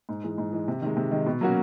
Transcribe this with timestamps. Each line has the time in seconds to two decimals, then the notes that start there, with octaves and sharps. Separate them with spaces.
0.09 G#2
0.24 E3 G#3
0.38 G#2
0.53 E3 G#3
0.68 C3
0.82 D#3 G#3
0.97 C3
1.11 D#3 G#3
1.26 B2
1.41 F#3 A#3 C#4 F#4